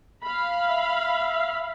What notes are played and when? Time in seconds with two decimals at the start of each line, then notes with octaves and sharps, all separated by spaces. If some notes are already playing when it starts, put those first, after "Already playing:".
0.24 F5 B5
0.70 E5